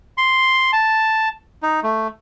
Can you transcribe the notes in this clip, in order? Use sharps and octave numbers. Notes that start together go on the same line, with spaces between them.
C6
A5
D#4
A3